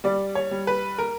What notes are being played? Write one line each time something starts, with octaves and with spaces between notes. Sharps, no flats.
G3 D5
C#5
G3
B4
A#4